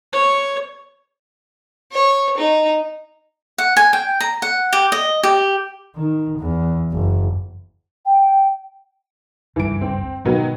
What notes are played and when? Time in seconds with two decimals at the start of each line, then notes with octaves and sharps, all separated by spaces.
0.13 C#5
1.92 C#5
2.37 D#4
3.58 F#5
3.77 G#5
3.93 G5
4.21 A#5
4.42 F#5
4.73 G4
4.92 D#5
5.23 G4
5.95 D#3
6.38 E2
6.92 F#1
8.05 G5
9.56 F#1 C#2 G2 E3 D7
9.81 C4
10.25 G#2 B2 D#3 F#3 B3